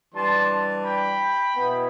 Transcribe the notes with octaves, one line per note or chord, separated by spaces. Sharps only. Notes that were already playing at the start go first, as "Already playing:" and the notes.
E3 G3 D4 A5 C6
G5 B5
B2 B3 E4